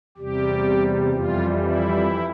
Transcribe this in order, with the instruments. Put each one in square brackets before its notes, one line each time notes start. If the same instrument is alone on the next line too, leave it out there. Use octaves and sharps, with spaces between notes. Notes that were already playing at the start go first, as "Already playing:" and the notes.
[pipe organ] E2 C3 G3 G4
F2 E3 G3 F4
E4